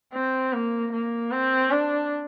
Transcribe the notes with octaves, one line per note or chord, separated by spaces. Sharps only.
C4
A#3
A#3
C4
D4